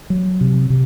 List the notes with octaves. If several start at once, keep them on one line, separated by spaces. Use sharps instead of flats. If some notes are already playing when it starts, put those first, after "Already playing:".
F#3
C3
C3